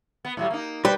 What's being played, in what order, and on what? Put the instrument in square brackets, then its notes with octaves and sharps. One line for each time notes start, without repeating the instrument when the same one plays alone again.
[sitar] B3
A2 F#3 G3
A#3 D#4
[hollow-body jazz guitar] G3 B4 [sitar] C5